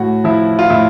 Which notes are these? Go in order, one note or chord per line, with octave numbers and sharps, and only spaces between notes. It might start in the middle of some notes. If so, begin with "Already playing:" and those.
Already playing: A2 F#4
F3 E4
F4
A2 E4